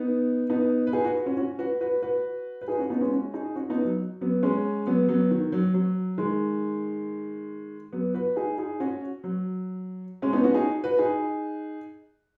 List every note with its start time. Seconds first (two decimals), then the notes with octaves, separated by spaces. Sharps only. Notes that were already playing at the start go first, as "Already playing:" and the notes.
Already playing: B3 D#4
0.50 B3 D#4
0.87 B4
0.93 D#4 G#4
1.04 F#4 B4
1.26 C#4 F#4
1.37 C#4 F#4
1.59 F#4 B4
1.81 F#4 B4
2.02 F#4 B4
2.62 B4
2.68 D#4 G#4
2.79 C#4 F#4
2.90 B3 D#4
3.01 G#3 C#4
3.12 C#4 F#4
3.34 D#4 G#4
3.56 C#4 F#4
3.70 B3 D#4
3.85 F#3
4.21 F#3 B3
4.43 G#3 C#4
4.87 F#3 B3
5.09 F#3 B3
5.31 D#3
5.52 F#3
5.74 F#3
6.18 D#3 G#3
7.92 F#3 B3
8.14 F#4 B4
8.36 D#4 G#4
8.58 D#4 G#4
8.80 C#4 F#4
9.24 F#3
10.22 G#3 C#4
10.33 B3 D#4
10.44 C#4 F#4
10.54 D#4 G#4
10.84 F#4 B4
10.99 D#4 G#4